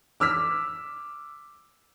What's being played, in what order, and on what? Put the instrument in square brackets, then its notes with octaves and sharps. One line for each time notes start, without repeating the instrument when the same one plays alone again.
[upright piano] D6 E6 F6 B6